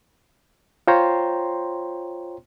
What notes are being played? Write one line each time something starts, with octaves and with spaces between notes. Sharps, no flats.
F4 C5 C#5 G5 A#5 C6